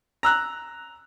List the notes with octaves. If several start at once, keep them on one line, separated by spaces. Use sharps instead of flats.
A#5 E6 F#6